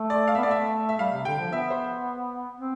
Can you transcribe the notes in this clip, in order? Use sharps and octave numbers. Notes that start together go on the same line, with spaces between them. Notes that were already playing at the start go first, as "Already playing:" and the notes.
Already playing: A3
D5
F5
B3 E5
A3 D5
E5
E5
G3 F5
C3
D3 G5
F3
B3 E5
C5
C4